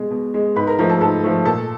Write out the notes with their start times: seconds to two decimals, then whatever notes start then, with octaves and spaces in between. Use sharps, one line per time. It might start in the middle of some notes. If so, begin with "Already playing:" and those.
Already playing: B2 G#3
0.11 B2
0.34 G#3
0.56 G#2 B4 B5
0.67 A#4 A#5
0.79 F3 A3 A#4 A#5
0.89 A4 A5
1.01 G#2 A4 A5
1.24 F3 A3
1.45 A#2 A4 A5